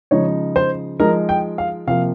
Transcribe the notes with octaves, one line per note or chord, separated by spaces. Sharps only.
C#3 F3 G#3 D#4 C#5
C5
F3 G#3 D#4 A#4
G5
F5
C3 F3 A#3 F5